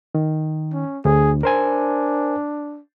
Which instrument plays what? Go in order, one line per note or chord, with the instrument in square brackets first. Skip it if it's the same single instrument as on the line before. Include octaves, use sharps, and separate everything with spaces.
[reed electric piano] D#3
[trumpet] C#4
[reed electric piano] D2 [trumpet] G#4
[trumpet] D4 [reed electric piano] A#4 C5 G#5